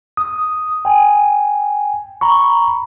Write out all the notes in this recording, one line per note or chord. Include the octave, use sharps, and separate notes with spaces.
D#6
G5 G#5
A#5 B5 C#6